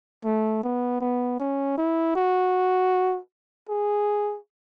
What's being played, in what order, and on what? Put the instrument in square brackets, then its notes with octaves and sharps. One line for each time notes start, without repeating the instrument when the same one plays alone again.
[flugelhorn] A3
B3
B3
C#4
E4
F#4
G#4